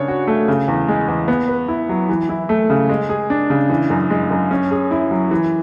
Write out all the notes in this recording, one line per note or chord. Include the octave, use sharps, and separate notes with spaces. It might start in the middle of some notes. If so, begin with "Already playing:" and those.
Already playing: C#3 D4 C#5
F#4
A3
C#3
E2
G#3
E2
B3
B4
E4
F#3
E3
E4
A3
C#3
G#3
G#4
D4
C#3
E3
F#2
G#3
F#2
C#4
G#4
E4
F#3
E3